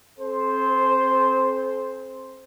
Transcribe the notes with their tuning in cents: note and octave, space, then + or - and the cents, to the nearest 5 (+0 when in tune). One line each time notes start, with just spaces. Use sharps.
C4 +30 A4 -40 C5 +0